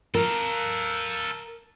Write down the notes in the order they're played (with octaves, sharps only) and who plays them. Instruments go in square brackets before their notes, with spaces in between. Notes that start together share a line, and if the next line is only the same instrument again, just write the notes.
[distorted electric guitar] A4 F5 [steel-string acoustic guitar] A#4